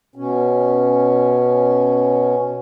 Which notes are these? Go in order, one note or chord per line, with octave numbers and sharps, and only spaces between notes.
B2 C#4